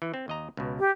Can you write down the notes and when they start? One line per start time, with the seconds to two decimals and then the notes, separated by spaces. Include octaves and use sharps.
0.02 E3
0.14 C4
0.28 D#2 D#5 A#5
0.57 C#2 B2
0.79 G4